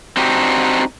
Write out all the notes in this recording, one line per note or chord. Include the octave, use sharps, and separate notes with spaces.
C4 D4 D#4 F#4 G4